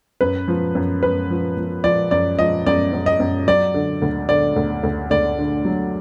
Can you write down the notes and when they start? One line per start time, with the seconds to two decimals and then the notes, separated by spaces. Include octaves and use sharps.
0.21 F#2 B4
0.48 F3
0.75 F#2
1.03 F#2 B4
1.30 F3
1.57 F3
1.84 F3 D5
2.11 F#2 D5
2.39 F3 D#5
2.66 F#2 D5
2.93 F#2
3.06 D#5
3.20 F#2
3.47 F#3 D5
3.74 D3
4.02 D2
4.29 D3 D5
4.56 D2
4.83 D2
5.10 D2 D5
5.39 D3
5.65 F#3